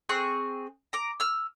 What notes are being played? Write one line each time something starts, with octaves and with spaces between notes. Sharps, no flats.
C4 G#4 C#6 F#6
A#5 D6
E6 F6